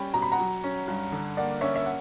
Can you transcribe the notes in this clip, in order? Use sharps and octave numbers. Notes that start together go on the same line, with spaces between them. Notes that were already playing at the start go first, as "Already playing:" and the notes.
Already playing: G3 C#4 G5 B5
B2 A#5
B5
F#5 A#5
F#3
C#4
G2
D3
A#3 D5 F#5
C#4 C#5 E5
E5
F#5